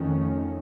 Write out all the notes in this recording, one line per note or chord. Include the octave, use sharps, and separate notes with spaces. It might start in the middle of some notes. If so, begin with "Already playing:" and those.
Already playing: F2 D#3 A3 C#4